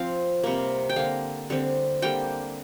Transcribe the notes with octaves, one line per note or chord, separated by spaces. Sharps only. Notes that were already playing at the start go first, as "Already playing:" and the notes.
Already playing: F3 C4 F5
C3 G3 A#3
G5
D3 A#3 F5
D3 G3 C4
D3 G3 A#3 G5